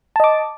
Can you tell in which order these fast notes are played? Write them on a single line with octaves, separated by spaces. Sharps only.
A5 D#5 D6